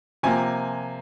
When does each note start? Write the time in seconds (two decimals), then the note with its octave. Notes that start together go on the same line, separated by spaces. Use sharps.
0.23 C3 F3 A#3 G#5